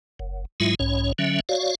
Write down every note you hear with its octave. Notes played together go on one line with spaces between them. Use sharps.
F#1
G#2 F#3 G#3 E4 F4 E5
B1 G#2 C#4 C#5
D3 F#3 C#4 E5
F#4 C#5 D5 F5